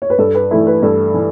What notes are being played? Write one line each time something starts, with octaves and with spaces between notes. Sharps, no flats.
C#5
B4
G2 A4
B4
E3 A3 E4 A4
B4
G2 A4
E3